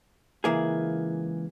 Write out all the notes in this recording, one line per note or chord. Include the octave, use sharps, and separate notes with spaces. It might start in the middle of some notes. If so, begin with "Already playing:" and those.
C#2 E3 A#3 G#4